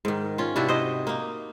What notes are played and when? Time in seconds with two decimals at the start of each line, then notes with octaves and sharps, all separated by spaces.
0.05 G#2 D#3
0.38 C#4 F4
0.56 C3 D4 E4 F#4
0.68 C5 D#5
1.07 A#3 D#4